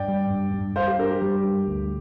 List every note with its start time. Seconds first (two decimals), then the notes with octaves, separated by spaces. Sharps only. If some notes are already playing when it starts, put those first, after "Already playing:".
Already playing: G2 D5 G5
0.08 G3
0.30 G2
0.54 G2
0.76 G2 C5 F5
0.88 G4 C5
0.99 D4 A#4
1.11 G4
1.22 G3
1.44 G2
1.67 D2